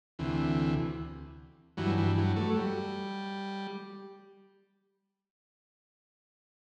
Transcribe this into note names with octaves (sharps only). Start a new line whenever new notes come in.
D2 C3 E3
G2 E3 F#3
E3
F#3
A3
F#3
G3